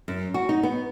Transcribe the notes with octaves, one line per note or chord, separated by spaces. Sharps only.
F#2
F#4
D#4
B3